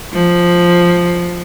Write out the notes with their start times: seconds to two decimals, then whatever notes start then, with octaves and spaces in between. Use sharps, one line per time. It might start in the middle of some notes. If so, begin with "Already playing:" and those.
0.13 F3